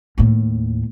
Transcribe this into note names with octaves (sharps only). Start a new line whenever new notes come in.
D#2 A2